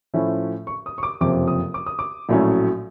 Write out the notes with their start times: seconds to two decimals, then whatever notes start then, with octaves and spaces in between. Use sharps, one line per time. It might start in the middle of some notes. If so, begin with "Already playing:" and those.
0.14 A2 F3 A3 C#4 E4
0.67 C#6
0.86 D#6
0.98 C#6
1.03 D6
1.21 F#1 F2 C3 F3 D6
1.47 D#6
1.74 D6
1.86 D#6
1.99 D6
2.29 A#1 A2 F#3 A3 C#4